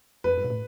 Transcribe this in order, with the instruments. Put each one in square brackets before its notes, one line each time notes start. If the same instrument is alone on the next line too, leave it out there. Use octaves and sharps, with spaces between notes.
[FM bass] F2 [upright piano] B4
[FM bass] G2
B2
A2